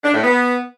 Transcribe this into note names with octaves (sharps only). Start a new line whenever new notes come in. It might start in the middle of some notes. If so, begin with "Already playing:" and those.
D4
A2
B3